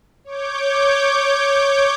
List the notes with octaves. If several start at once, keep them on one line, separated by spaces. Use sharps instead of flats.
C#5 D6 G6